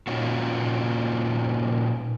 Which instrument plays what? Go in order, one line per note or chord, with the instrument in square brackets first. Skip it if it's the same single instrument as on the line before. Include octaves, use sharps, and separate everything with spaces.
[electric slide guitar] A#2 C#4 D#4 F4 F#4